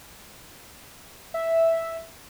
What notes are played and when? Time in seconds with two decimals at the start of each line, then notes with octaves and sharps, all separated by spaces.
1.34 E5